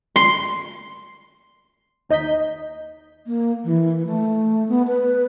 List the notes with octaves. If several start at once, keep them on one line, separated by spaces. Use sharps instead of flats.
C6
D#2 D#4 D#5 G6 B6
A#3
E3
A3
B3
B4